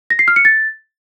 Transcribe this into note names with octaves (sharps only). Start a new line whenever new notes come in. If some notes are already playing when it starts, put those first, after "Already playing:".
A#6
C7
F6
C#7
A6